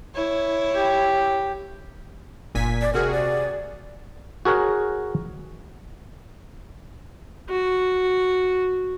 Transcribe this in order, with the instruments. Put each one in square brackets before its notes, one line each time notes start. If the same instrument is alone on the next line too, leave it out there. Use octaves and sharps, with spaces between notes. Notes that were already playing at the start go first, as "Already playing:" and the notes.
[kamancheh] E4 C#5
[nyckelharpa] G4
[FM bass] F#1 [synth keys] A#2 G#5 B6
[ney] D5
[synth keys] C3 F#4 G#4 [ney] A#4
[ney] D5
[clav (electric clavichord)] F#4 G#4 A#4 C#5 F#5
[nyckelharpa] F#4